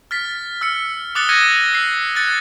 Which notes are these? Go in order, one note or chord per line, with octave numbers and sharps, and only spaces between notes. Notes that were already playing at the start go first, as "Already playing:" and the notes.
F6 A6 B6
E6 F6 C#7
D6 D#6 F#6 A6 C#7 G7
D#6 F#6 G#6 A#6 C#7 D#7
E6 C7
F#6 G#6 A6 C#7